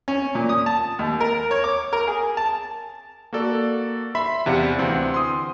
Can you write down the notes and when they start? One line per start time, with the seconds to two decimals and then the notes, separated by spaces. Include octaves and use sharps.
0.08 C#4
0.35 A#2
0.49 D#6
0.66 A5
0.99 D#2
1.20 A#4
1.51 C#5
1.64 D6
1.93 A#4
2.08 G#4
2.37 A5
3.33 A#3 F#4 A4 D5
4.15 E5 B5 C6 B6
4.46 E2 C3 D5 F5 C#7
4.79 D2 E3 C4
5.14 C6 D#6